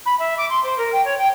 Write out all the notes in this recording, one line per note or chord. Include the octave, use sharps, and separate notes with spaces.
B5
E5
D6
C6
C5
A#4
G5
C#5
G5